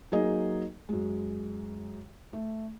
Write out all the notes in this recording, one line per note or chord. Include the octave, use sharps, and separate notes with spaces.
F#3 A#3 D#4 G#4 D#5
F#2 G#3
A3